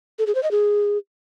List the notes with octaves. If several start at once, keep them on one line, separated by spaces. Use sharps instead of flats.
A4
G#4
C5
D#5
G#4